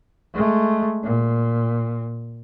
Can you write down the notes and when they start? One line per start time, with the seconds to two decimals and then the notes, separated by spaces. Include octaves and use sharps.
0.34 G#3 A3
1.03 A#2